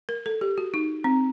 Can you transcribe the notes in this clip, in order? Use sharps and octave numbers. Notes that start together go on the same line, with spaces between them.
A#4
A4
G4
F#4
D#4
C4